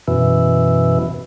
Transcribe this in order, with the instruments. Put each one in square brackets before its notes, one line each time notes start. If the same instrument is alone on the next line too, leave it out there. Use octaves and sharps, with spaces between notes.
[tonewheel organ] F#2 B2 E3